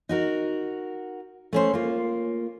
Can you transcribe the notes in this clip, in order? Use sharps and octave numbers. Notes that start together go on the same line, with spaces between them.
D#4 F#4 A#4
A3 C#4 C5
A#3 F4